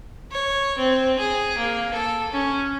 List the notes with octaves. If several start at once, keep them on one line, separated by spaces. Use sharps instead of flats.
C#5
C4
G#4
A#3
A4
C#4